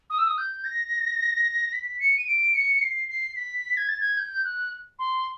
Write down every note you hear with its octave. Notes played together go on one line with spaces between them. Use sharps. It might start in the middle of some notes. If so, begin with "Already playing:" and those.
D#6
E6
D#6
G6
A#6
B6
C#7
D#7
D7
C#7
C7
C7
B6
G#6
A6
G#6
G6
F#6
C6